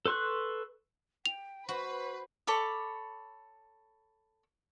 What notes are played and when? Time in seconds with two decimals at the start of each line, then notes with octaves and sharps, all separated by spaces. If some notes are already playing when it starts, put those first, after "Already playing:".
0.06 A4 B4 C6 C#6 F#6
1.26 G5 F7
1.69 F#4 B4 C5
2.47 A4 C#5 B5 D6